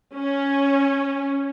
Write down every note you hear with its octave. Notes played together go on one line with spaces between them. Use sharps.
C#4